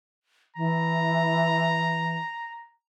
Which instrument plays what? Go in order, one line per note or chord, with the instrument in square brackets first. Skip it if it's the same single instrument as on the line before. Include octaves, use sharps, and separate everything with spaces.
[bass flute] E3 [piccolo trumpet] A#5